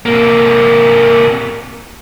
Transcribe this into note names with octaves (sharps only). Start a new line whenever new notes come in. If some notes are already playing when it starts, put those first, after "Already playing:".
C3 A#3